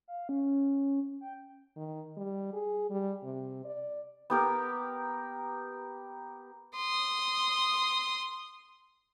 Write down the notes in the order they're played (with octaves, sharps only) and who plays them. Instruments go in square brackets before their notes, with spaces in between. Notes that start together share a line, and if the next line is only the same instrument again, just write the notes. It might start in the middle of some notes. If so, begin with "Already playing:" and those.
[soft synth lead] F5
C#4
G5
[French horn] D#3
G3
G#4
G3
C3
D5
[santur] B3 G4 A#4
[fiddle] C6 D#6